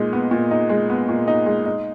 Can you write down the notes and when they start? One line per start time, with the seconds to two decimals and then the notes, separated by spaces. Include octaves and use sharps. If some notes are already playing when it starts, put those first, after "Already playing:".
Already playing: A#2 G#3 D#4
0.13 B3
0.31 A#2
0.51 D#4
0.69 G#3
0.90 B3
1.09 A#2
1.28 D#4
1.46 G#3
1.66 D#4